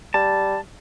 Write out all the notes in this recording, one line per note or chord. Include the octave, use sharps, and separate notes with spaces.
G3 A5